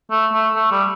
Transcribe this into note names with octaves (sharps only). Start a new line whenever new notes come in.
A3
A3
A3
G3